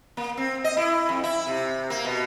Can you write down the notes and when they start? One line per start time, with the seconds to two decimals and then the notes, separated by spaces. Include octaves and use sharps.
0.17 A#3
0.37 C4
0.64 D#5
0.77 E4
1.09 F2
1.24 E4
1.47 C3
1.90 A#3
2.05 B2